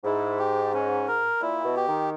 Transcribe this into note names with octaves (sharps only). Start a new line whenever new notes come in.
G#2 E4
G4
C#4
A#4
A#2 E4
B2
G4
D#3